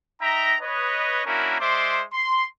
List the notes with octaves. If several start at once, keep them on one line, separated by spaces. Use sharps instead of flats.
D#4 E5 G5 A#5
B4 C#5 D#5
A#3 C#4 D4 E4 F#4 A#4
G#3 C5 D5 E5 C6 D6
C6